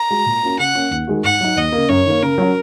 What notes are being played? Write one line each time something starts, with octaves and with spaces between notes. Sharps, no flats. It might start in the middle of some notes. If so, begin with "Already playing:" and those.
Already playing: A#5
G#3 F#4
A#2
A#3 C#4 F#4
C#3 F#5
A#3 C#4
D#2
D#3 G#3 F#4
G#2 F#5
F#3 D#4
D#2 D#5
A#3
C#3
F#2 C#5
D#3 A#3
C#3 A#4
F#3 C#4 F#4